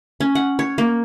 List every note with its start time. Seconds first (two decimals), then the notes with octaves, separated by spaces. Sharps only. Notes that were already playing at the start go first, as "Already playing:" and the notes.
0.20 C#4
0.35 F#5
0.59 C#5
0.78 A#3